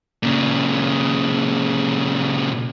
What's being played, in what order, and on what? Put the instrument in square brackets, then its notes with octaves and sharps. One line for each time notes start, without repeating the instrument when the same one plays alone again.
[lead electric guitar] A#2 C#3